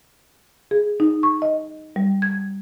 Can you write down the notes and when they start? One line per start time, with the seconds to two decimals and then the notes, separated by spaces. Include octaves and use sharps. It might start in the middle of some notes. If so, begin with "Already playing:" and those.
0.71 G#4
1.00 D#4
1.23 C#6
1.42 D#5
1.96 G3
2.22 G#6